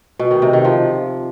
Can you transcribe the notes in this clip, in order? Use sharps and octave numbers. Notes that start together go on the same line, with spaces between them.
B2
D#3
C3
D#3
F3